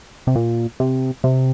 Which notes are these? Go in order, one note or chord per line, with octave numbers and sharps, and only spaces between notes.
C3
A#2
C3
C3